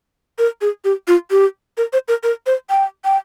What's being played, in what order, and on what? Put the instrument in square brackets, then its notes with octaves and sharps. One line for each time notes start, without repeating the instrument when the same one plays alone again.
[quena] A#4
G#4
G4
F4
G4
A#4
C5
A#4
A#4
C5
G5
G5